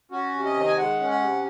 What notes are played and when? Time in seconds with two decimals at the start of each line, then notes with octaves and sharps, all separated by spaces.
0.11 C#4 F#4
0.34 C3
0.45 D#5
0.55 D#3
0.67 G#5
0.78 G#3 F#5
1.00 C#4
1.11 F#5
1.21 C3